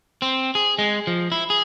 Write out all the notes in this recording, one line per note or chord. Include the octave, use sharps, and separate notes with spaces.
C4
G#4
G#3
F3
E4
G#4